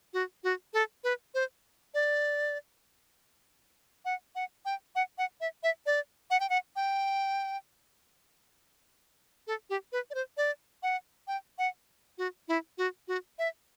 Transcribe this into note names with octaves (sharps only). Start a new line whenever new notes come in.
F#4
F#4
A4
B4
C5
D5
F#5
F#5
G5
F#5
F#5
E5
E5
D5
F#5
G5
F#5
G5
A4
G4
B4
D5
C5
D5
F#5
G5
F#5
F#4
E4
F#4
F#4
E5